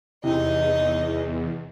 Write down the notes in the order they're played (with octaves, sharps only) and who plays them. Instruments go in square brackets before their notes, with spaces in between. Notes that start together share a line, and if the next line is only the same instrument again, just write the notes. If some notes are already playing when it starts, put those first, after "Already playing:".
[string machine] E2 [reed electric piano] C3 [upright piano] E3 C4 [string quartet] D#4 D#5